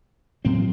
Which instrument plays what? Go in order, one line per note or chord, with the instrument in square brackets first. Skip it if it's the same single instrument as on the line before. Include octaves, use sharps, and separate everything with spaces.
[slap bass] A2 F#3 A3 C4